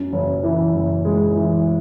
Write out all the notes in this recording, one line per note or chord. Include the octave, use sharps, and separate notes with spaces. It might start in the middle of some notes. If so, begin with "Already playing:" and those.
Already playing: F#2
F#1
E3
F#1
G#3
E3